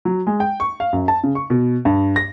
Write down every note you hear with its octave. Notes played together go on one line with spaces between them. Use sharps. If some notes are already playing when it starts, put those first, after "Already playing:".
F#3
G#3
G5
C#6
F5
F#2
A5
C#3
C#6
B2
G2
A#6